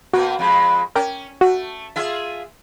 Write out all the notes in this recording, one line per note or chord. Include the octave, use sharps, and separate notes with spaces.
B2 A#3 F#4
F2 G#3
C#4 A#4 G5 D6
A3 F#4
F4 G#4 E5